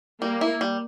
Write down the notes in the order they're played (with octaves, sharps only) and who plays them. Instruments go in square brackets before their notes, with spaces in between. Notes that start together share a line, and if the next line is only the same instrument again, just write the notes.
[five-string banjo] G3 [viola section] A#3
[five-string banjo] E4
G3